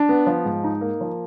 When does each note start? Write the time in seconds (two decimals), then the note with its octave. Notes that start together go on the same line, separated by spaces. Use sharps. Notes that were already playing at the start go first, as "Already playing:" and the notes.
Already playing: D4
0.09 B3
0.27 F3
0.45 G#2
0.64 D#4
0.81 A#3
1.01 F3